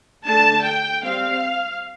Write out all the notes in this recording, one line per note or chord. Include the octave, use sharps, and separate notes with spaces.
D3 A3 D4 A5
G5
G3 C4 F5